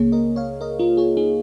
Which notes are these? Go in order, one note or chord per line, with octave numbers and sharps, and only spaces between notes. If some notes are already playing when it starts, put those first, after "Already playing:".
Already playing: C#2 C#3 A#3 G#4 C#5
A#4 D#5
C#5 F5
A#4 D#5
F4 A#4
G#4 C#5
D#4 G#4